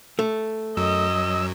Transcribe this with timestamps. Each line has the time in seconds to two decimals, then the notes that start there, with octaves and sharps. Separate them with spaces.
0.19 A3
0.77 F#2 F#3 D#5 E6